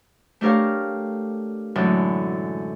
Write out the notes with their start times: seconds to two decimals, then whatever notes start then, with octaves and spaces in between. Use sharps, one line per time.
0.41 A3 D4 G4 A#4 C#5 F5
1.75 F#2 A2 D3 E3 G#3